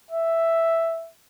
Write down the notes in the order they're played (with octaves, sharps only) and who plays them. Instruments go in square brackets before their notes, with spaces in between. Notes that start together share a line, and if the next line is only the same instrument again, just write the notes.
[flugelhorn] E5